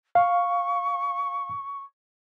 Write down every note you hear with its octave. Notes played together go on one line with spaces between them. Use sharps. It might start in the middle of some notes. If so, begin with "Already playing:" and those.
F5 C#6